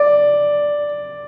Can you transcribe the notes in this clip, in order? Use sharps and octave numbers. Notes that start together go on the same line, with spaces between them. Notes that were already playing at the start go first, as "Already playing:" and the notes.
Already playing: D5